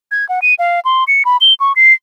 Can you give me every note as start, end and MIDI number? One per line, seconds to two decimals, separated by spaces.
0.11 0.27 92
0.29 0.40 78
0.42 0.54 99
0.59 0.80 77
0.85 1.04 84
1.08 1.23 97
1.25 1.37 83
1.41 1.54 103
1.60 1.73 85
1.76 1.93 96